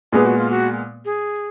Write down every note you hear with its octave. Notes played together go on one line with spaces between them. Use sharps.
A#2 G#3 B3 G#4
F#4
F4
F#4
G#4